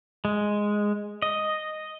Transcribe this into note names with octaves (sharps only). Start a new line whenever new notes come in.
G#3
D#5